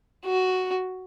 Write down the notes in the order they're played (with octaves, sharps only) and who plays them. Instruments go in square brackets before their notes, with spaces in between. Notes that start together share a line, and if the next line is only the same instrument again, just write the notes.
[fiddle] F#4